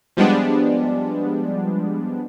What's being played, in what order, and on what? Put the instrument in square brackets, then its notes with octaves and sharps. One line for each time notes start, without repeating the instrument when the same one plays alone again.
[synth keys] F3 G3 G#3 B3 D4